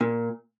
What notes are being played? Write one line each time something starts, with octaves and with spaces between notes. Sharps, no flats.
A#2